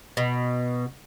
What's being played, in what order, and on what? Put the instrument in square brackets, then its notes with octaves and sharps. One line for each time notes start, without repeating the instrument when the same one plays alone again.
[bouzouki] B2